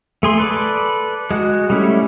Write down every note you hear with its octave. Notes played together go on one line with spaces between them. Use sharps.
A3 G#4 C6
A4 B4 D5
G#3 F#4
G3 A3 C#4 E4